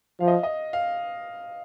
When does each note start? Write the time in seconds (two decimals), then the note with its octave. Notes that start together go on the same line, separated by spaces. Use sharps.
0.20 F3 F5
0.28 D#5
0.43 D#5
0.73 F5